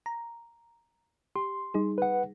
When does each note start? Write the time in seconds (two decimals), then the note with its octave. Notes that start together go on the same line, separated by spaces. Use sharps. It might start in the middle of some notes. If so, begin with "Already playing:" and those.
0.06 A#5
1.36 G4 C6
1.74 G3 D#4 G#4
1.98 B4 F#5